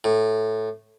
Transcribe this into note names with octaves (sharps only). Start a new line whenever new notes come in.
A2